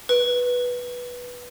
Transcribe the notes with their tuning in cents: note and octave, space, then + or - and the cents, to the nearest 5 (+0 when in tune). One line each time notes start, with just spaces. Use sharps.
B4 -10